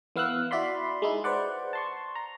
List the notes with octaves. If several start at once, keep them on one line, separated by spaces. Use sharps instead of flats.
E3 B3 F5 E6 F#6
E4 F#4 D5 B5 C6
G#3 D#4 E4
B4 C5 D5 F#5
A5 C6 C#6
A#5